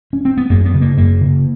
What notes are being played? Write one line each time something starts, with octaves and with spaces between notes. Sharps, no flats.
C#4
C4
B3
F#2 A#3
B3
C#3
A#3
F#2 A#3
C#3